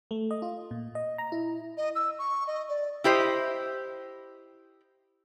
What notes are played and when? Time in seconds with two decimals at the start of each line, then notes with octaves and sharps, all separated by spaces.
0.11 A3
0.31 D#5
0.42 F4
0.71 A#2
0.95 D#5
1.18 A#5
1.32 E4
1.77 D#5
1.95 E6
2.19 C#6
2.47 D#5
2.69 D5
3.04 E4 G4 C5 D#5